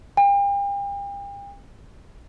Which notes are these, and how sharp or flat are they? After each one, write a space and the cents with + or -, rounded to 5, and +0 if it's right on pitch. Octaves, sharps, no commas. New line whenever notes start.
G5 +40